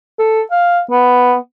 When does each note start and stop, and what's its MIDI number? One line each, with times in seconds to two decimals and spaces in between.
0.19 0.42 69
0.51 0.80 77
0.91 1.35 59